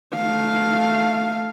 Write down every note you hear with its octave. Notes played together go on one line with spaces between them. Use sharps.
A3 F5